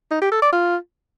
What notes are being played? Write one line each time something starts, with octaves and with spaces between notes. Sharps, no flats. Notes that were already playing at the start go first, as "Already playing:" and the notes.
D#4
G4
A4
D5
F4